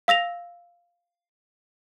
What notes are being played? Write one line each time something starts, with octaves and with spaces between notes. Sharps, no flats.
F5 E6 A#6 F7